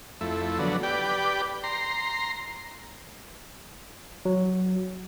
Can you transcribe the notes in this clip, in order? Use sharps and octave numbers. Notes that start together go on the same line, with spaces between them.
F2 A3 E4
D3 F#3 B3
G4 B4 D5 G5
A#5 C6
F#3